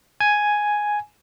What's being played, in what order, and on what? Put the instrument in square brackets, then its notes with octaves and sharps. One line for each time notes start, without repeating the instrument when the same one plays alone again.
[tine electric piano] G#5